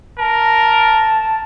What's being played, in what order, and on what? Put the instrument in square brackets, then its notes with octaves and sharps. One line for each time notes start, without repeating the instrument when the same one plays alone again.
[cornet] A#4 [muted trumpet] A5